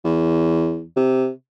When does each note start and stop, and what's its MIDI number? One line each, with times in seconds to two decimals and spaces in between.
0.05 0.84 40
0.96 1.29 48